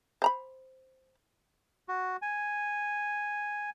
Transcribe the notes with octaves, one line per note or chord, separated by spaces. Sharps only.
C5 A#5 B5
F#4
G#5